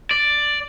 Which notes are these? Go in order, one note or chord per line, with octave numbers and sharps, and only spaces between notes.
D5